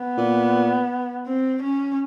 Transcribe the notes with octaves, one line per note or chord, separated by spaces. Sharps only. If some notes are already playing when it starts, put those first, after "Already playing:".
Already playing: B3
A#2
C4
C#4